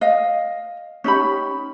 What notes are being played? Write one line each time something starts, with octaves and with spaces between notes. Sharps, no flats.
D#5 F5
C#4 D#4 G4 B5